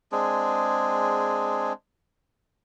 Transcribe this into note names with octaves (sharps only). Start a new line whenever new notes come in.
G#3 C4 D4 G#4